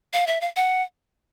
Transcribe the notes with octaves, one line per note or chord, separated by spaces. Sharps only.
F5
E5
F5
F#5